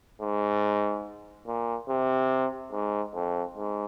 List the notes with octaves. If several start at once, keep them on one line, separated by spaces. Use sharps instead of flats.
G#2
A#2
C3
G#2
F2
G#2